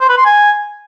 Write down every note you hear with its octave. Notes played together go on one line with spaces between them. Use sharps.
C5
B4
C6
G#5